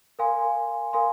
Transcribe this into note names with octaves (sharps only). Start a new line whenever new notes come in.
A#4 F5 G#5 C6
A#4 F5 G#5 C6